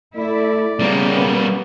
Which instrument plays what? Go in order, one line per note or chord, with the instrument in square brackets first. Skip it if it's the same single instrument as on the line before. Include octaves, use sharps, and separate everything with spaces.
[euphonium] A3 [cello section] E4 [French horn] D5
[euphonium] C#3 [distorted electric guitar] G3 A#3 [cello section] B3